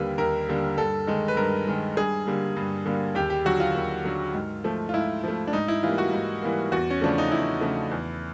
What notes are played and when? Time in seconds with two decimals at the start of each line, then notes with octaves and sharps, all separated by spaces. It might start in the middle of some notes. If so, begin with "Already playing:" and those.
Already playing: D#2 D3 G3 A#3 B4
0.18 D#2 A#4
0.48 D3 G3 A#3
0.77 G2 A4
1.07 D#3 G#3
1.28 B4
1.37 G2 A#4
1.67 D#3 G#3
1.97 G2 G#4
2.27 D3 G3 A#3
2.57 G2
2.86 D3 G3 A#3
3.15 D#2 G4
3.30 G4
3.45 D3 F#3 F#4
3.60 F4
3.75 D#2
4.05 D3 F#3
4.34 G#2
4.64 F3 A3
4.89 F4
4.94 G#2 E4
5.24 F3 A3
5.47 D4
5.53 G#2 D#4
5.68 E4
5.83 E3 G3 A#3 F4
5.98 F#4
6.13 G#2
6.42 E3 G3 A#3
6.72 E2 F#4
6.90 C#4
7.02 C#3 F3 A3 D4
7.18 D#4
7.32 E2 E4
7.61 C#3 F3 A3
7.91 E2